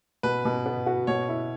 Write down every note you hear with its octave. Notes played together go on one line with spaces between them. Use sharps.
B2 B4
B2
B3
F#4
B2 C#5
E4